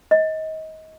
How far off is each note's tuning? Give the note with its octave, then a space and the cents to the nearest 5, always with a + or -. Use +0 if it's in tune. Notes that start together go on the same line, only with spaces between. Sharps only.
D#5 +25